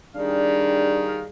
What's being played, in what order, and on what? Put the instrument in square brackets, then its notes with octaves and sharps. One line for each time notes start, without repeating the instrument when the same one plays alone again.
[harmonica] D#3 F5 [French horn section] G3 G#4 [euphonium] D4